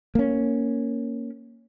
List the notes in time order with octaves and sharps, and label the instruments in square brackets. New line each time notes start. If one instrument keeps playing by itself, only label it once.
[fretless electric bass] A#3 C#4